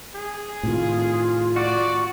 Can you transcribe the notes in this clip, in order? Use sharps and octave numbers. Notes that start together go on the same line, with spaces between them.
G#4
A2 C3 D#3 F4
F#4 D5